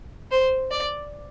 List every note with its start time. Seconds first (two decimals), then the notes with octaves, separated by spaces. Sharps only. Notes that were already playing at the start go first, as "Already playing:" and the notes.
0.31 C5
0.71 D5